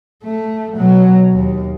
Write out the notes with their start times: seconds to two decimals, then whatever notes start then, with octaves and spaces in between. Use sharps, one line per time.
0.24 A3
0.75 B2 F#3
1.33 D#2